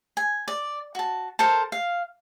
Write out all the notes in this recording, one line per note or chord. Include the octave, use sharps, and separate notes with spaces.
G#5
D5
F#4 A5
A4 A#4 C5 A5
F5